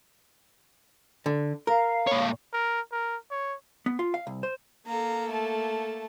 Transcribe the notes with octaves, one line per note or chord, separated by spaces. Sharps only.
D3
A#4 F5
A#2 C#5
A#4
A#4
C#5
B3
F4
F5
C2
C5
A#3 A4 F5 A#5
A3 A5